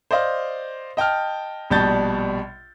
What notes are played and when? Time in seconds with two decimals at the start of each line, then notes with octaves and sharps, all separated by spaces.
0.11 C5 D5 D#5 F5
0.97 D#5 G5 A5 F6
1.70 A#1 B2 G3 A5 G6 A6